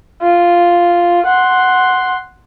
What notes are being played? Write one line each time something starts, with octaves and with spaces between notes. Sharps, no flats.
F4
F#5 C6